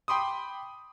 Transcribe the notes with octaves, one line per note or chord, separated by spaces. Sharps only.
G5 B5 C6 D6 D#6